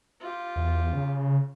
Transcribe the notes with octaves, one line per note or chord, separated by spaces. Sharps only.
F4 G4
E2
C#3